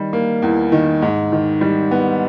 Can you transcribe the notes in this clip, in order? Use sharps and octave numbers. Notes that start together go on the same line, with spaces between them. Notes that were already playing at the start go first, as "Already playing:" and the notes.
Already playing: D#3 G3
A#3
E2
D#3
G#2
D#3
G3
B3